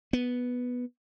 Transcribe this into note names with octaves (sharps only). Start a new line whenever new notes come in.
B3